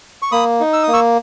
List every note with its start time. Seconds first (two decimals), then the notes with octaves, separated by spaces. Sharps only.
0.22 C#6
0.32 A#3 B5 D#6
0.60 D#4
0.73 E6
0.83 A#3 D#6
0.93 C#6 E6